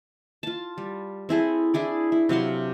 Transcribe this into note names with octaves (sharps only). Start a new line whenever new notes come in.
F4 A5
G3
C4 E4 G#4 A4
D4 E4 G#4 D5
E4
C3 F#3 F5 C6